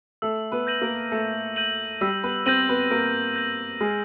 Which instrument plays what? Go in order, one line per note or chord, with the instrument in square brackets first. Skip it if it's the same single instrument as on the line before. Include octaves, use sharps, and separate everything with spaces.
[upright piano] A3 A4 [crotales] E6
[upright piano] B3 B4
[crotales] G6 A#6 D#7 F#7
[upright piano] A#3 A#4
[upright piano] A3 A4 [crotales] E6
[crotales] G6 A#6 D#7 F#7
[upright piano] G3 G4 [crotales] E6
[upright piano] B3 B4
[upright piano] C4 C5 [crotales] G6 A#6 D#7 F#7
[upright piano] B3 B4
[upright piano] A#3 A#4 [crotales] E6
[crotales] G6 A#6 D#7 F#7
[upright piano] G#3 G#4 [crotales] F6